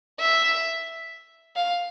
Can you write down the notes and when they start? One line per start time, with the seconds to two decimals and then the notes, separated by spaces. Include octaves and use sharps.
0.20 E5
1.56 F5